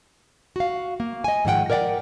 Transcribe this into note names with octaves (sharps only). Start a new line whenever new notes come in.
F#4 F5
A#3
D#5 G#5
G#2 D#3 F3 E4 F#5 G5
A#4 C#5 D5 E5 F#5 G5